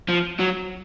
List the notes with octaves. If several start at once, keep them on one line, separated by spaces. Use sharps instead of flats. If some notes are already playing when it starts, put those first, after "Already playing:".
F3
F#3